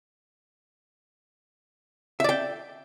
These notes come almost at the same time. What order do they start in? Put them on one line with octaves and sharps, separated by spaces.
E5 D5 G5